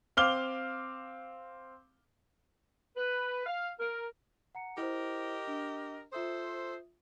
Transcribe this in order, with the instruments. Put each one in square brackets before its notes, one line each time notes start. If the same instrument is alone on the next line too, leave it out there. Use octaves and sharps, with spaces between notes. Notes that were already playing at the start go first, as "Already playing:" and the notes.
[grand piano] C4 F5 D6 F6 G7
[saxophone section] B4
F5
A#4
[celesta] F#5 A#5 C#7
[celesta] E4 C5 [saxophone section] G4 A#4 D#5
[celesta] D4
[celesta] F4 E5 D#6 [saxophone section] A4 C5